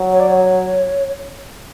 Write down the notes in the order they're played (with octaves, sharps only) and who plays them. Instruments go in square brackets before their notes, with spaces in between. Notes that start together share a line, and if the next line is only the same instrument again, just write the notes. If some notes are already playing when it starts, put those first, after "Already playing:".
Already playing: [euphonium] F#3
[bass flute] C#5
D5
C#5